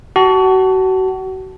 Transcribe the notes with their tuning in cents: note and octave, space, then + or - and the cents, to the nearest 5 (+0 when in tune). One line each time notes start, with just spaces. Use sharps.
F#4 +30 A5 +0